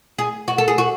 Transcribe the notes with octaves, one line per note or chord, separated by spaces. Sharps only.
G#4
F#4
A4
G#4
F#4